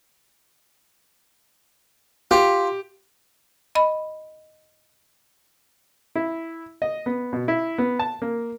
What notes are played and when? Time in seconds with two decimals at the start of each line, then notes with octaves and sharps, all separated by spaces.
2.31 F4 G4
3.75 D#5 B5
6.15 E4
6.82 D#5
7.06 B3
7.33 B2
7.48 E4
7.78 B3
7.99 A5
8.22 A#3